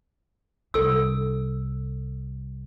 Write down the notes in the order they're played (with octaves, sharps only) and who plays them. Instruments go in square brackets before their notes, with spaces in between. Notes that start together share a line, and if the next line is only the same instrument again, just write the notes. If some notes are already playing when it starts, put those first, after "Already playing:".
[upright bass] C2 D4 [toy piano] A4 E6